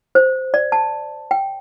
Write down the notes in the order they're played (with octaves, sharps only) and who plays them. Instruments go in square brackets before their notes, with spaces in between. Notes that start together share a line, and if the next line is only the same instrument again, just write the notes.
[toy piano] C5
D5
A5
G5